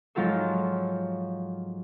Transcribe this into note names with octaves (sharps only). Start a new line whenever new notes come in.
G#2 F3 F#3 F4 A4 C5